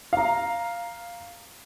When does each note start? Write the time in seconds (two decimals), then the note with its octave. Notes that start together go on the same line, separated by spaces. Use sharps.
0.13 F5 A#5